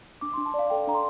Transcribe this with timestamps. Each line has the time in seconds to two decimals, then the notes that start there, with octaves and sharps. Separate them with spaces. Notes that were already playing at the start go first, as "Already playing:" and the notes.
0.21 D4 D6
0.34 C6
0.38 D4
0.46 A5
0.54 D5
0.59 F5
0.70 A4 G5
0.87 D4 A#5
0.95 C6